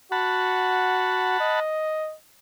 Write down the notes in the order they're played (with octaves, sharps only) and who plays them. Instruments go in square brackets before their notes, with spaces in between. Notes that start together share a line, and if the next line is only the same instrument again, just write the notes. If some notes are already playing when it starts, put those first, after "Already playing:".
[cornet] F#4 [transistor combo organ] F#5 A5 B5
[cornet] D#5